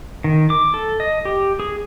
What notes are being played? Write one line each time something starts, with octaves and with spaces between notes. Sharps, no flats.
D#3
D6
A4
D#5
G4
G#4